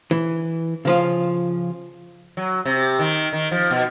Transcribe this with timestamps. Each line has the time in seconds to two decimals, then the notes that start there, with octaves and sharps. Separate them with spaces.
0.11 E3
0.85 C#3 F3 F4
2.37 F#3
2.65 C3
2.99 D#3
3.33 D#3
3.51 F3
3.71 B2